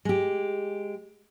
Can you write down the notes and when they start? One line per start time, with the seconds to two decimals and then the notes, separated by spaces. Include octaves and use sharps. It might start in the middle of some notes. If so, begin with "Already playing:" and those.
0.05 G#3 G4